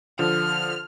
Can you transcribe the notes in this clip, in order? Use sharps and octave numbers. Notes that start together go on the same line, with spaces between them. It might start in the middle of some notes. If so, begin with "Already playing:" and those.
D3 F3 F6